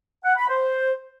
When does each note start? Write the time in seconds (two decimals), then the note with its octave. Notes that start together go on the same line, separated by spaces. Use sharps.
0.25 F#5
0.37 B5
0.48 C5